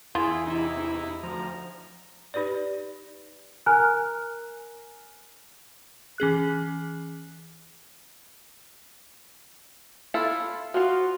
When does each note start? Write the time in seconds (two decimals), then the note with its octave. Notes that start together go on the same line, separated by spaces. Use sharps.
0.15 E2 E4 F4 G#4
0.47 C3 D#4 E4
1.23 D2 F3 A#5
2.34 D#4 G4 B4 D5
3.66 A#4 G#5 A#5 F6 F#6
6.18 E3 C#4 G#4 F#6
10.14 E4 F4 A4
10.74 F3 F4 F#4